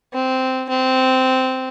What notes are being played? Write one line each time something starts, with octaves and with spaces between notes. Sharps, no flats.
C4
C4